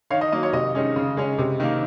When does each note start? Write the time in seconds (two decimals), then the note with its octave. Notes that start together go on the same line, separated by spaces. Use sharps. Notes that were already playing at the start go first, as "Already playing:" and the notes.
0.11 D#3 C#5 F5
0.21 D#5
0.32 F#3 A#3 D#5
0.43 C#5
0.53 C3 D#5
0.75 D#3 G#3 C#4
0.96 C#3
1.17 G#3 C#4
1.38 C3
1.60 D#3 A#3